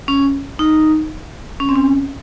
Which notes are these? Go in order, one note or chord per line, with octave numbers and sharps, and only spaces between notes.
C#4
D#4
C#4
C4
C#4